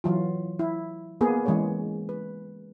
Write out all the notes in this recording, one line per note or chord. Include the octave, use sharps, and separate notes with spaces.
E3 F#3 F4
E4
A#3 B3 G#4
E3 G#3 C#4 G#4 C#5
B4